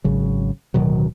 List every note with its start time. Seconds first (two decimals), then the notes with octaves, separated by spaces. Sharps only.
0.04 G#1 C#3 F#3
0.74 D1 B2 D#3 F#3